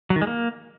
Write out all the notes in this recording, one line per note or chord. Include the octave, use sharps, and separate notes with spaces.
F#3
D#3
G#3
A#3